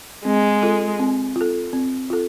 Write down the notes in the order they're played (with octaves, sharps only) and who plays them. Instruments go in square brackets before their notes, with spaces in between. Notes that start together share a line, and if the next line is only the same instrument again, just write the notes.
[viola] G#3 [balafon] C4
[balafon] F4 A4
C4
F4 A4
C4
F4 A4